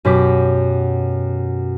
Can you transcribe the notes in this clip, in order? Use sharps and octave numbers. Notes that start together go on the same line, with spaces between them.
F#2 B2 G4 D6 B6